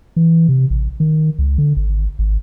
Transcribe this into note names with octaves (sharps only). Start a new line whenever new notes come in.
E3
C3
A1
D#3
C#2
D3
G#1
G#1